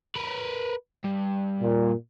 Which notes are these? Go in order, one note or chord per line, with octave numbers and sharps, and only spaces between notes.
A#4 B4
G2
A#2